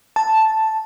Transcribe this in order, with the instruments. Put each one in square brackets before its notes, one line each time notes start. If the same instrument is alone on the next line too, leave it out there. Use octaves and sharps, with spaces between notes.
[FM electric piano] A5